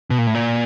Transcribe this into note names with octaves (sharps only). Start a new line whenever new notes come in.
B2
A#2
A2
A#2